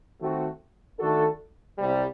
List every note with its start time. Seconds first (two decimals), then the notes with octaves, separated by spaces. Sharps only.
0.20 D#3 A3 C4 F#4
0.99 D#3 A3 D4 F#4 A4
1.77 C2 C3 G3